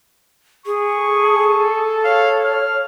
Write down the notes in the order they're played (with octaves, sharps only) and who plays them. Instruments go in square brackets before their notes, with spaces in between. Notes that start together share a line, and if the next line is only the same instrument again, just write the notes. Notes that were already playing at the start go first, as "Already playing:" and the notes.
[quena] G#4 [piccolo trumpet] C#6
[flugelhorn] A4
[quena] C#5 [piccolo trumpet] F5
[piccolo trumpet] F6